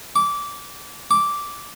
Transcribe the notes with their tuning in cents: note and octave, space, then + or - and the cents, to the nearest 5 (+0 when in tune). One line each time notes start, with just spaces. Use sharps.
D6 -20
D6 -10